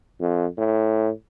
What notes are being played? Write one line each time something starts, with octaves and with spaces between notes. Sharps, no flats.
F2
A2